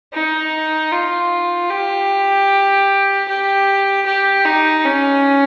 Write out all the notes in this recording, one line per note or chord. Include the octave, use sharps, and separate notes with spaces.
D#4
F4
G4
G4
G4
D#4
C#4